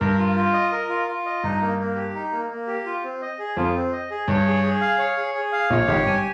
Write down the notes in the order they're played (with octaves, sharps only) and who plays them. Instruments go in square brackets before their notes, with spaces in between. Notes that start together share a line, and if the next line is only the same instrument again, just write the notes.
[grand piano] G2 [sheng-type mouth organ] A#4
[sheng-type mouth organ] F4
F4
D#5
A#4
F4
F4
D#5
[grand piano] G2 [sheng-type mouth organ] D#4
[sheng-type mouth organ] A#3
A#3
G4
D#4
A#3
A#3
G4
F4
C4
D#5
G#4
[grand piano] F2 [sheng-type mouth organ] F4
[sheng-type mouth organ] C4
D#5
G#4
[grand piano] G2 [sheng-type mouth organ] C#5
[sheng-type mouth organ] G#4
G#4
F5
C#5
G#4
G#4
F5
[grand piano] A#1 A#2 [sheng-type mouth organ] C#5
[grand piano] G#1 G#2 [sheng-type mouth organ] G4
[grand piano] G2 [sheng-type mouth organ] G#5